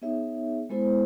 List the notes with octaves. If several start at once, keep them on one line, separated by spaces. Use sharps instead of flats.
B3 D#4 G#4 C#5 E5
G#3 B3 E4 A4 C5